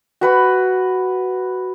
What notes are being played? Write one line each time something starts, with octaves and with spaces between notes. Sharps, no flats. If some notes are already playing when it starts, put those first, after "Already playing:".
F#4 B4 B5